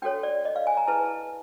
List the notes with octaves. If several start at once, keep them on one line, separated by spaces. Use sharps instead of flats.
D4 F#4 A4 C#5 G5
D5
D#5
F5
G#5
A#5
E4 G#4 B4 A5